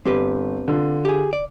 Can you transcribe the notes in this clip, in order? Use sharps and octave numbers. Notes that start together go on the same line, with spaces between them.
G1 C4 G4 B4
D3 F4
G4 G#4
D5